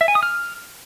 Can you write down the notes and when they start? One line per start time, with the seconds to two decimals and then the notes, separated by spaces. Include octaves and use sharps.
0.01 E5
0.08 G#5
0.15 D#6
0.23 F6